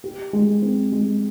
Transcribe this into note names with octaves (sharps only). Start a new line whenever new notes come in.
G4
G#3
C4
G#3